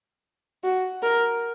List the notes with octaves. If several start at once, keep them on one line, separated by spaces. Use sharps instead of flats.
F#4
A#4